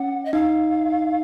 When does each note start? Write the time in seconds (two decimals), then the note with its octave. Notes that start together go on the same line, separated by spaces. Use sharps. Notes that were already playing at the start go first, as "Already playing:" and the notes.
Already playing: C#4 F#5
0.25 D#5
0.33 D#4 F5